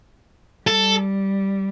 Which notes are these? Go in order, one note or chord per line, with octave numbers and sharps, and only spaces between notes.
G3 A4